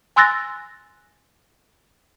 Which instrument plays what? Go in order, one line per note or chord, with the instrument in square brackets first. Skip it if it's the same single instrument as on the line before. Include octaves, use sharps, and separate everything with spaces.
[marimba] G#5 C6 E6 F#6 A6 A#6